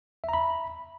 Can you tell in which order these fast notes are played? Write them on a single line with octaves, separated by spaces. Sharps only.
E5 A#5 B5